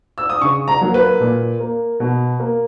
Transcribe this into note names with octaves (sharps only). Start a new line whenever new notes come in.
E6
D#6
C#3 C#6
A#5
F#3 A#3
B4
A#2
A#3
B2
A#3